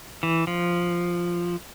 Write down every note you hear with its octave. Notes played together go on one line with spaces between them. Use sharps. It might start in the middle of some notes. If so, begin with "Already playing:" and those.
E3
F3